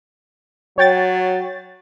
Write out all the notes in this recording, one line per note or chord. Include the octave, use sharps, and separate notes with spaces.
F#3 C#5 G5 A6